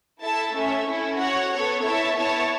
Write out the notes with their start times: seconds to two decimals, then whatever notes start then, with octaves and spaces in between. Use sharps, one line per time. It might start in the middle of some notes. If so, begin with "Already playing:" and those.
0.22 E4 A4 E5 A5
0.54 A3 C#4 A4 E5
0.86 C#4 E4 A4
1.18 F#4 C#5 F#5
1.51 B3 A4 C#5
1.83 E4 C#5 E5 A5
2.15 B3 E4 C#5 A5